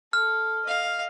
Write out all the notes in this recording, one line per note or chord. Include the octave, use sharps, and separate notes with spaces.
A4 F6
D#5 F5